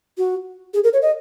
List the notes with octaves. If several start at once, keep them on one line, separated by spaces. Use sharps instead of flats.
F#4
G#4
A#4
C#5
D#5